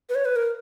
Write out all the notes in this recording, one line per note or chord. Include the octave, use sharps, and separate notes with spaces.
B4
C#5
B4
A#4